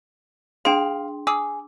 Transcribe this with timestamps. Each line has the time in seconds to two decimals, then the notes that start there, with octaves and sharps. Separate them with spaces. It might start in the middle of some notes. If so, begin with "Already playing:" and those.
0.65 D4 G#4 F5 G5 C6
1.27 G#4 D6 E6